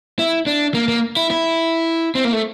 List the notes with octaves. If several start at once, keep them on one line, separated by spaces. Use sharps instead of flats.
E4
D4
A#3
A#3
E4
E4
C4
A#3
A3